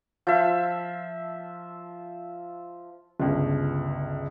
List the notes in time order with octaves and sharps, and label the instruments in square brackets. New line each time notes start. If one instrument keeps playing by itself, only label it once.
[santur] F3 E5
[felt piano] G1 C#2